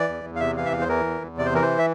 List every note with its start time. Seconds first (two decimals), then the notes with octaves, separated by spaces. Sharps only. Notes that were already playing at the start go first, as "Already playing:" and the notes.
Already playing: E3 D5
0.08 E2
0.24 E2
0.36 F5
0.40 C3 E5
0.57 E3 F5
0.65 E5
0.72 E2 F5
0.81 C5
0.89 E3 A#4
1.05 E2
1.21 E2
1.37 C3 D5
1.46 C5
1.53 E3 A#4
1.62 C5
1.79 E5